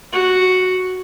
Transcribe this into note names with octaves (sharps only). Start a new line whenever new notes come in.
F#4